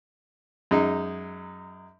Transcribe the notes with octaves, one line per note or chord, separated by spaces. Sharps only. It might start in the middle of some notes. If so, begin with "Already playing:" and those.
F#2 G#3 D#4